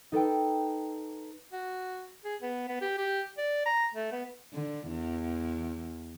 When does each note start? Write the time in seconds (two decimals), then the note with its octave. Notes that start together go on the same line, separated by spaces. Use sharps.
0.12 D#4 A4 B4 G5
1.53 F#4
2.25 G#4
2.42 B3
2.69 B3
2.81 G4
2.98 G4
3.38 D5
3.66 A#5
3.94 A3
4.12 B3
4.53 D3
4.88 E2